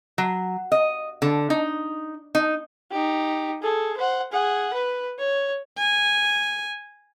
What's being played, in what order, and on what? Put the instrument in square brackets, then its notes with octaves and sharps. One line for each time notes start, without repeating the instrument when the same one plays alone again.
[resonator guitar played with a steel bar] F#3
D#5
D3
D#4
D#4
[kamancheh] D#4 G4
G#4 A4
C5 F#5
G#4 F#5
B4
C#5
[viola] G#5